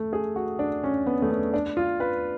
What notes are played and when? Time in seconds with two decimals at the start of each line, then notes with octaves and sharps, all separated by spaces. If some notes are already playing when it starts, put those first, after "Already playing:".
Already playing: A3
0.13 G#4
0.36 F#4
0.59 D4
0.84 C#4
1.07 B3
1.22 A3
1.31 B3
1.53 D4
1.77 F4
2.00 B4